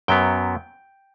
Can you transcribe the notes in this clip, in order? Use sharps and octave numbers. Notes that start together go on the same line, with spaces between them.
F#2 F#3 B3 G5